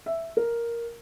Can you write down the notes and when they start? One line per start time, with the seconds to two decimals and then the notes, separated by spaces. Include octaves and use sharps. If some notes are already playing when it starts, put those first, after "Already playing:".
0.06 E5
0.37 A#4